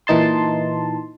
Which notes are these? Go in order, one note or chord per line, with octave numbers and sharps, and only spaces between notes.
A#2 E3 D#4 A5 C6